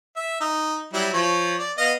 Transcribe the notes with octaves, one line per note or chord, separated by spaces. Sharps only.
E5
D#4
F#3 G3 E4
F3 C#5
D5
B3 D#5 F5